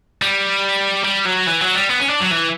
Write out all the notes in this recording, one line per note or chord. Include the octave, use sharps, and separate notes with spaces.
G3
G3
F#3
E3
F#3
G3
B3
C#4
D4
F#3
E3